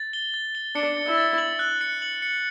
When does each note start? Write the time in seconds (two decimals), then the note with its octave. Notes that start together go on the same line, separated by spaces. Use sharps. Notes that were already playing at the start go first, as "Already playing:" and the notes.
Already playing: A6
0.13 G7
0.34 A6
0.55 G7
0.75 D4 C#7
0.97 A6
1.07 E4
1.17 A6
1.38 F#7
1.59 F#6
1.81 C#7
2.02 F#7
2.22 C#7